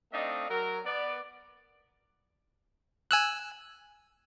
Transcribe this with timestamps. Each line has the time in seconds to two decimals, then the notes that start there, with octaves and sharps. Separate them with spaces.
0.13 A3 C4 D4 D#4 D#5 F5
0.49 F#3 A#4
0.85 B3 D5
3.11 G#5 E6 F#6